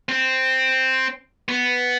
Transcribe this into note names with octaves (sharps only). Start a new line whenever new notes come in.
C4
B3